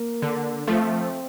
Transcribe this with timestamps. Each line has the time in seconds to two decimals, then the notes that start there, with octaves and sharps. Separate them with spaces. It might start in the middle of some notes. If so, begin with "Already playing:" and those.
Already playing: A#3
0.22 D3
0.67 F3 A3 C4